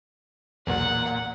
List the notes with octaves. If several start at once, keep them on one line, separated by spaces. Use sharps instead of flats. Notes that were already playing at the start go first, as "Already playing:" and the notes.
B1 E2 A#2 F#5